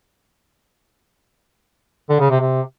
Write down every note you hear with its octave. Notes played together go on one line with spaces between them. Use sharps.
D3
C#3
C3
C3